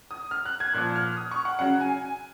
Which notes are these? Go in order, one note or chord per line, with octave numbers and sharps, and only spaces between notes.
D#6
F6
F#6
G#6
A#2 F3 F#6
F6
D#6
C#6
F#5
C#3 F#3 F#5
G#5
G#5